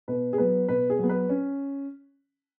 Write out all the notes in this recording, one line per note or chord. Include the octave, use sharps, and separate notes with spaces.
B2 B4
G#4
F#3 B3 B4
B2 B4
G#4
F#3 B3
B4
C#4